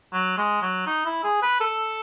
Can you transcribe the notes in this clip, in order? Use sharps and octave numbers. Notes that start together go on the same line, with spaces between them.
F#3
G#3
F#3
D#4
E4
G#4
B4
A4